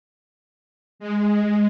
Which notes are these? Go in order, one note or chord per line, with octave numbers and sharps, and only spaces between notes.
G#3